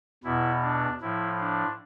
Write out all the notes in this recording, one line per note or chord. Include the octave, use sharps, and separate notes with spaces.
E2 B2 E4
D4
A2 F3 E4
D4